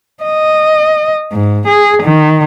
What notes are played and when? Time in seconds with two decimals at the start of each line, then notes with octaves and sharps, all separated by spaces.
0.23 D#5
1.32 G#2
1.68 G#4
2.03 D#3